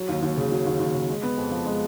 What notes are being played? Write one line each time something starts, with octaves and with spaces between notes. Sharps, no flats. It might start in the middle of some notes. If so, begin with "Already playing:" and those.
Already playing: F#3
D#2
D#2
C#3
F#3
D#2
D#2
C#3
G#3
B3
F2
F3
G#3